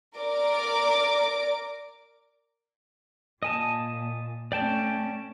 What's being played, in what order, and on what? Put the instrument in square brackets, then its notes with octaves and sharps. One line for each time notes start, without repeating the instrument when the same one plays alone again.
[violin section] A#4 D5 D6
[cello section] A#2 [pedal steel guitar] D#5 G#5 A5
[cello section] A3 C#4 [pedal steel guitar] D5 G5 A5